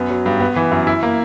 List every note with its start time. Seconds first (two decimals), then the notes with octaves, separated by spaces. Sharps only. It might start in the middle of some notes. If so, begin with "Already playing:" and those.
Already playing: F#2 B3
0.10 F#3
0.26 G2
0.40 B3
0.56 E3
0.71 F#2
0.87 E4
1.03 A#3